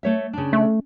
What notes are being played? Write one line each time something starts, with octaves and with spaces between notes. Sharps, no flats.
A3 C#5 E5
C#3 D4
A3